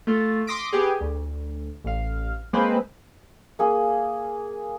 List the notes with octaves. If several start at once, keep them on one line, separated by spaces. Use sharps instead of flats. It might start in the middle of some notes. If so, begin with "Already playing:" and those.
A3 F4
C6 D6 D#6 A#6 B6 D7
B3 G4 G#4
D2
A1 F5
G#3 A#3 C4 B4 C5
A#3 G#4